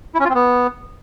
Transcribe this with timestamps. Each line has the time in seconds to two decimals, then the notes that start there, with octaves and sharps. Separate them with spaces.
0.14 E4
0.20 C#4
0.25 F4
0.30 C4
0.35 B3